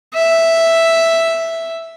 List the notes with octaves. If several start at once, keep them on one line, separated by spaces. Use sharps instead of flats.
E5